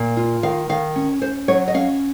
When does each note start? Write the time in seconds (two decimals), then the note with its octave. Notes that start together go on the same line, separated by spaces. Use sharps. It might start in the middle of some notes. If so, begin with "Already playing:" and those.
Already playing: A#2
0.17 F4
0.43 D#3 F5
0.69 D#3 F5
0.96 C#4
1.22 C#4 C5
1.48 F#3 C#5
1.68 D#5
1.74 C#4 F5